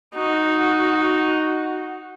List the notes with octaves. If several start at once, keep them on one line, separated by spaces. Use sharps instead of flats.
D#4 F#4